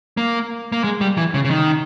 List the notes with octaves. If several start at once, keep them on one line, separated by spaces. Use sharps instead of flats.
A#3
A#3
G#3
G3
E3
C#3
C#3
D#3